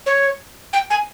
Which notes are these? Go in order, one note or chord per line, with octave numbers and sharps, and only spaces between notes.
C#5
G5
G#5